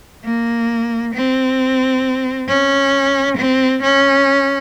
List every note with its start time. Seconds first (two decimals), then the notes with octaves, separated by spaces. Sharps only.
0.24 A#3
1.15 C4
2.48 C#4
3.37 C4
3.82 C#4